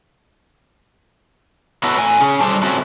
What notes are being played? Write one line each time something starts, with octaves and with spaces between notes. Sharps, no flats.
B3 E4 F#4 A4 B4 C#5
A2 G#5
C#4 G#4
D3 F#3 G3 C5 A5
A3 C4 C#4 E4 F#4 A4